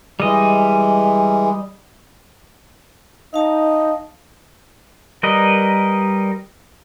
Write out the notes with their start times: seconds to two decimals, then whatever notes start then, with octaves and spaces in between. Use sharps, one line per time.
0.20 E3 G3 G#3 D#5
3.34 D#4 D#5 F5 A5
5.23 G3 A#4 B4 D#5